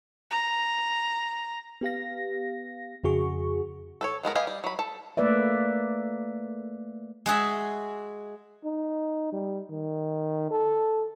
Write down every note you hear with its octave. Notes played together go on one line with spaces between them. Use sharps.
A#5
B3 G4 F5 A#6
F2 C#3 F#4 G#4 C#6
A4 B4 C#5
F3 G#3 B3 A#4
G4 B4 D#5 F5 G#5
G3
F#3 B5
A4
A3 A#3 B4 D5 E5
G#3 F#4 G#4 E5
D#4
G3
D#3
A4